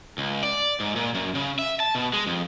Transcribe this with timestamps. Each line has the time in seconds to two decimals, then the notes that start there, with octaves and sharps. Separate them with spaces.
0.18 C#2
0.43 D5
0.80 G#2
0.96 A#2
1.15 F#2
1.35 C#3
1.59 E5
1.80 A5
1.95 B2
2.13 G#3
2.27 F2